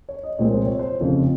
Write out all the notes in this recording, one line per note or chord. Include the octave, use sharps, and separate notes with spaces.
C#5
D#5
C2 A#2 F3 G#3 C4 C#5
C5
C#5
C5
F1 F2 C#3 F3